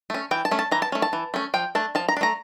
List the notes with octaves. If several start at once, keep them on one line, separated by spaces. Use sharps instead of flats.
A3 C#4
E3 G5
A5
A3 C#4
A5
E3 A#5
A5
A3 C#4
A5
E3
A3 C#4
F3 G5
A3 D4 A5
F3 A5
A#5
D4
A3 A#5